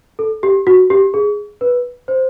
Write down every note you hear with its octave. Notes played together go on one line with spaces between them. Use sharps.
A4
G4
F#4
G4
G#4
B4
C5